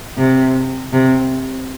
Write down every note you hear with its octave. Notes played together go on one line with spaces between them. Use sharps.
C3
C3